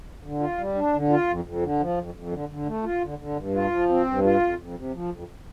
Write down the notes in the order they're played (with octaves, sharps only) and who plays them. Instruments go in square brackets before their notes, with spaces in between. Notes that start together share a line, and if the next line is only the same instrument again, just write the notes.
[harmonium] D3
F4
G3
D4
D3
F4
F2
F2
D3
F3
F2
F2
D3
D3
A3
F4
D3
D3
G2
F4
F3
C4
G2
F4
F2
F2
C3
F3
F2